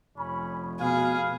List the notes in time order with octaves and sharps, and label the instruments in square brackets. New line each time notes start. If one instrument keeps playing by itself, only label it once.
[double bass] F1 [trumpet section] C#4 B5
[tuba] B2 [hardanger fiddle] G#4 [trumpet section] B4 F5